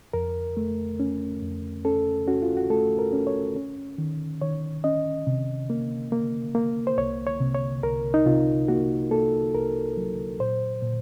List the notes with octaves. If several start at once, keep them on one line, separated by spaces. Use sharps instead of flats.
F2 A#4
A3
C#4
F2
C#4 A4
C#4 F#4
F4
F#4
A3 A4
A#4
C#4
C#5
C#4
D#3
D#3 C#5
C#4 D#5
C3
A#3
A#3
A#3
C5
C2 C#5
C#5
C3
C#5
C2 A#4
D#4
C3 F4
A#3 F#4
A#3 A4
C2 A#4
F#3
A#2 C5
A#2